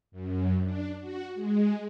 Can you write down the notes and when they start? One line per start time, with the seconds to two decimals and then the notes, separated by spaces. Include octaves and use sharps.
0.11 F#2
0.63 D4
1.00 F#4
1.35 G#3